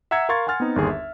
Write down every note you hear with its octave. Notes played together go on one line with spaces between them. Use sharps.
E5 F#5 A#5 E6 G#6 C#7
A#4 F5 C6 C#6 G#6 A6
F#5 G#5 C6 F6 A6
B3 C4 D#4
G1 D#2 G#4
E5